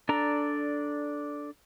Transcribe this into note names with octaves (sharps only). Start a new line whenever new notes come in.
D4 A4 D5 A#5